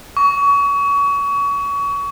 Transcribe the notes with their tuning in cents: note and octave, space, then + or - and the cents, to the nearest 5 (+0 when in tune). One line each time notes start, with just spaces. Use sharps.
C#6 +30